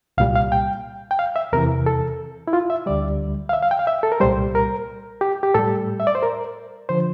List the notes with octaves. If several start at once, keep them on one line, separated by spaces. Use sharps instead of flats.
C2 A#2 G3 F5
F5
G5
G5
F5
E5
E2 C3 E3 A#4
A4
E4
F4
E5
D2 D3 G3 D5
F5
E5
F5
G5
F5
E5
A4
A#4
C2 A#2 G3 C5
A#4
G4
G4
A2 G3 A4
E5
D5
C5
A#4
D3 F3 C5